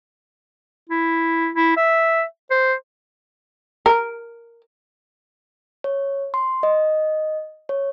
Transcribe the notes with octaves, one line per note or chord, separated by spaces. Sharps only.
E4
E4
E5
C5
A#4
C#5
C6
D#5
C#5